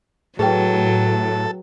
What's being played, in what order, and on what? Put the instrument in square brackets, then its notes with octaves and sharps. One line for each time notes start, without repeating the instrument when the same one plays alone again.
[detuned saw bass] A2 [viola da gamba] F#3 [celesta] G#4 B4 G5 [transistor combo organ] A4